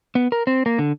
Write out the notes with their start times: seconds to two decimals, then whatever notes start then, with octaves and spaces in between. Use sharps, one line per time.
0.15 B3
0.32 A#4
0.47 C4
0.66 A#3
0.79 D3